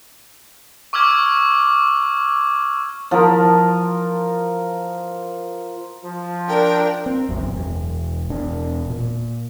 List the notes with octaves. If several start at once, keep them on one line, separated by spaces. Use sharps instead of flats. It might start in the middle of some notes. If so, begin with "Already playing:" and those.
C#6 D6 E6 F6 G#6
F3 A#4
F3
D4 A#4 G5
C4
D#1 A1 F#2
E1
E1 D4
A#2